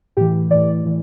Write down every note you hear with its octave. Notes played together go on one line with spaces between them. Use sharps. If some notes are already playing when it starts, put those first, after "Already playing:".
A2 E3 G4
A2 E3 D5
A2 E3